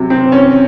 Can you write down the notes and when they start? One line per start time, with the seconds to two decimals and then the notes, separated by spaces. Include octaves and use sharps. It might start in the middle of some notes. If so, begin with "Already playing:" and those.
Already playing: C3 F#3
0.10 C4
0.32 C#4